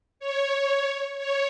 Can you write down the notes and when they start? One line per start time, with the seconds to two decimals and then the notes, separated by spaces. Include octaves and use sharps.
0.20 C#5
1.18 C#5